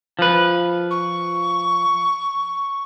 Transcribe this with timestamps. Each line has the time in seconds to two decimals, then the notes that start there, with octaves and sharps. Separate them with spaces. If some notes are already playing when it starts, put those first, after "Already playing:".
0.19 F3 B4
0.91 C#6